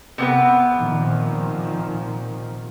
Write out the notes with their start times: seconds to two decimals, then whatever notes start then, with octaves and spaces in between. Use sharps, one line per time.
0.18 C3 B3 B4
0.78 A#2 D#3 F3